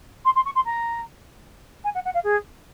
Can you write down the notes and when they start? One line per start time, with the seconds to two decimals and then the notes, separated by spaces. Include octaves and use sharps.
0.25 C6
0.35 C6
0.45 C#6
0.55 C6
0.65 A#5
1.84 G#5
1.94 F#5
2.05 F#5
2.14 F5
2.24 G#4